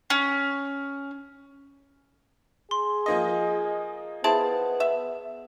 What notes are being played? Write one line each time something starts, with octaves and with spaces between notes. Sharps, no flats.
C#4
G#4 C6
F3 A#3 D#5 A#6
B3 E4 G#4 C5 A5
E5